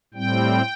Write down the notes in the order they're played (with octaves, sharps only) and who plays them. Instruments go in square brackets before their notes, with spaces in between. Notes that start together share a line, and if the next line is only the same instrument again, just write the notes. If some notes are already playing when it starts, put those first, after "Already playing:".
[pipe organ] A2 G3 C4 G5